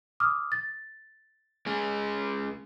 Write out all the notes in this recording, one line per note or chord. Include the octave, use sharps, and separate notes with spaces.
D6 D#6 F6
A6
G#3 C#4 G#4